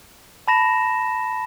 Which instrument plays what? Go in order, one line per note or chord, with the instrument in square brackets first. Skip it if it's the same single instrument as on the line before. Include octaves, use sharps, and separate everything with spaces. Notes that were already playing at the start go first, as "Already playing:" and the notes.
[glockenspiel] A5 B5 A#6 E7